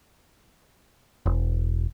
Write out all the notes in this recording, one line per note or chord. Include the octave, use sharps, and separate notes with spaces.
E1